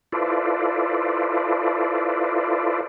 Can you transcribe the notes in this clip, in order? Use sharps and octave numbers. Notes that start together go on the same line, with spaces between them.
E4 F4 A4 B4 C5 D5